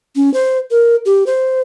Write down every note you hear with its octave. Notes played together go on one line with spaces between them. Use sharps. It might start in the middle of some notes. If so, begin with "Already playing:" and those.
C#4
C5
A#4
G4
C5